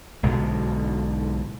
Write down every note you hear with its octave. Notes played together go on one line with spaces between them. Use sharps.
B1 G#2 B2 D3